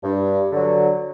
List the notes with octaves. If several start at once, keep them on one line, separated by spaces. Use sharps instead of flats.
G2
D3 F#3